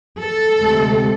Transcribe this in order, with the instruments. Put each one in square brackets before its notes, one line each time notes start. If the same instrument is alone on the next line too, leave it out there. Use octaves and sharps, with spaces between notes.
[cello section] A4
D2 C3 G#3